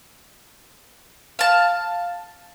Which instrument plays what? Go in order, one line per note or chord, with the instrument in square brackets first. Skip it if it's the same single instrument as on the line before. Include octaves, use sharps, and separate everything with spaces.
[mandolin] F5 A5